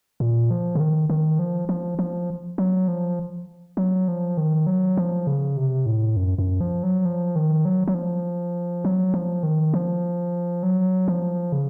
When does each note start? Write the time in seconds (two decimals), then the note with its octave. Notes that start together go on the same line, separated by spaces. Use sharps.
0.20 A#2
0.51 F3
0.75 C#3
0.80 D#3
1.10 D#3
1.39 F3
1.69 F3
1.99 F3
2.58 F#3
2.88 F3
3.77 F#3
4.08 F3
4.37 D#3
4.67 F#3
4.97 F3
5.27 C#3
5.57 C3
5.86 A2
6.17 F#2
6.38 F#2
6.61 F3
6.83 F#3
7.05 F3
7.36 D#3
7.65 F#3
7.88 F#3
7.94 F3
8.85 F#3
9.14 F3
9.43 D#3
9.74 F3
10.63 F#3
11.08 F3
11.52 C#3